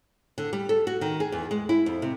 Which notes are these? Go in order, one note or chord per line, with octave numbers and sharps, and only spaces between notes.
D3
G3
A4
F#4
D#3
G#4
E2
G#3
E4
F2
C3